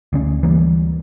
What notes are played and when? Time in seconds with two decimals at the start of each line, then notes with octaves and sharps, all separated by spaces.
0.13 D2 D3 C#4
0.43 D2 E3 G3 A#3